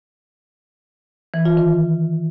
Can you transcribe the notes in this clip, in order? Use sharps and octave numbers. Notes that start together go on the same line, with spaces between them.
E3
F4
D#3